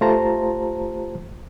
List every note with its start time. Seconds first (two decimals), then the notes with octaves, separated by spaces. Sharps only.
0.01 A3 F4 G4 C5 A5 A#5